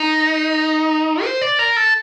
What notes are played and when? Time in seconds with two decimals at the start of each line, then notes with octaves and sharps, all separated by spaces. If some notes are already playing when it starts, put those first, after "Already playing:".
Already playing: D#4
1.24 C5
1.41 D5
1.59 A#4
1.76 A4